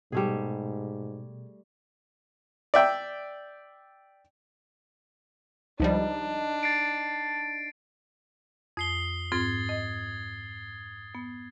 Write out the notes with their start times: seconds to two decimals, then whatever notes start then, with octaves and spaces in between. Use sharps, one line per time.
0.12 G#2 B2 G3 A3 G#4
2.74 D5 E5 G5
5.80 C#2 F3 G3 D4 D#4
6.63 A6 C7 D7
8.77 F2 D#6 C7 G7
9.32 G#2 C4 F4 G#6 A6 G7
9.69 D#5
11.15 B3